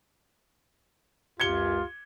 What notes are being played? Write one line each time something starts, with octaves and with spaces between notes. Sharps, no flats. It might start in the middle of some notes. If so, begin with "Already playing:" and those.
C#2 F#2 F4 G4 G#6 C#7 G7